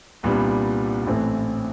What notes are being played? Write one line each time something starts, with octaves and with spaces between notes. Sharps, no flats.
C2 A#2 G3 B3 D4
A1 A2 E3 A3 C4